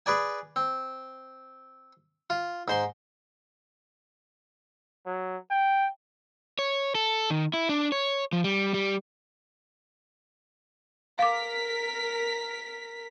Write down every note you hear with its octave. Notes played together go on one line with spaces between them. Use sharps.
G#4 B4 D5 G#5
C4
F4
G#2 C5 C6
F#3
G5
C#5
A4
D#3
E4
D4
C#5
F3
G3
G3
A#4 F5 D6 B6